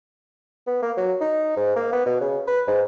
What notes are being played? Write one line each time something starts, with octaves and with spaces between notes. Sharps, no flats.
B3
A#3
F#3
D#4
G#2
A#3
B3
B2
C#3
B4
G#2